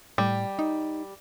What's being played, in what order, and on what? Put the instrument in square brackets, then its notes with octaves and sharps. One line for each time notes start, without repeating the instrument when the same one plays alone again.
[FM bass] A2 [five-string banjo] G3
[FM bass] D#4